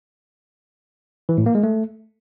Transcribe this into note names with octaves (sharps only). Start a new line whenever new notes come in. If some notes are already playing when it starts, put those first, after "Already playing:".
E3
A2
A#3
G#3
A3